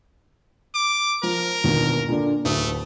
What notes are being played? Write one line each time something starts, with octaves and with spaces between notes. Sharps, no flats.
D6
F3 A#4
G1 D#2 B2
A#2 D3 D4
D1 A3 D#6